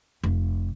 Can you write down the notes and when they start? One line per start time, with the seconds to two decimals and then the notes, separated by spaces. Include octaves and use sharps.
0.23 F1